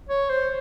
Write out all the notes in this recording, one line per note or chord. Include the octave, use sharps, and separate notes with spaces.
C#5
C5